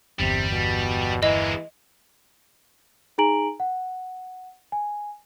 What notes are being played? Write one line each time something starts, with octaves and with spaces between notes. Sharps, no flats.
G1 E2 C3 G3
B2
E3 G#3 A#3 D#5
D#4 G#4 G#5 A#5 D7 F#7
F#5
G#5